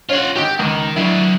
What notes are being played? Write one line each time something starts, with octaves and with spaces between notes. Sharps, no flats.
C#4 F4 C#5 F#5
G#1 F#4 G4
C#2 D#3
F#3 D4 E4